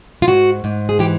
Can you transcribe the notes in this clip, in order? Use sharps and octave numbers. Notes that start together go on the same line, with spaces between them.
F4
G#2 F#4
G#2
G#4
E3 G4